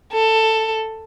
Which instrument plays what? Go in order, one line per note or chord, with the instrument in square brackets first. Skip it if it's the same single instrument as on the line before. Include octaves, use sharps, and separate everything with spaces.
[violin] A4